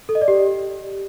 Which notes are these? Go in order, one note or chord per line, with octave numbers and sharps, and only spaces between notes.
A4
D#5
D5
G4